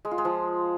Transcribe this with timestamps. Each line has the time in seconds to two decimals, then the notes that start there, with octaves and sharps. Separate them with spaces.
0.05 G#3
0.11 F4
0.18 G#3
0.25 F3